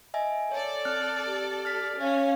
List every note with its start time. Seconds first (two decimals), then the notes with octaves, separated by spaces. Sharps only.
0.14 D#5 E5 G#5
0.52 A4 C#5 D5
0.85 C4 F6 F#6
1.26 G4
1.65 F6 A6 B6
1.99 C#4 F5